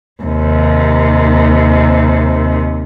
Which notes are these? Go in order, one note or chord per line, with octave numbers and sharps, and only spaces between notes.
D#2 C3